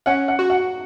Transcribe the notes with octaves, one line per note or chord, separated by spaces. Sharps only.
C#4 F#5
F#5
F#4
F#5